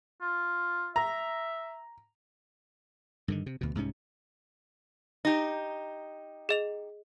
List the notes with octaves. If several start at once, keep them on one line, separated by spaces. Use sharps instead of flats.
F4
E5 A#5
G2 D3 D#3
C3
D2 B2
C2 G#2 C3 C#4
D#4 G4
G#4 D#5 F7